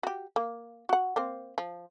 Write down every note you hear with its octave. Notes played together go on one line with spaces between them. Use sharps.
F#4 G4
A#3
F#4 F#5
A#3 C4 C5
F3